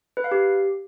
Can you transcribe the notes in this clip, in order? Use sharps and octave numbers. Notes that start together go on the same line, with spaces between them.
B4
F5
G4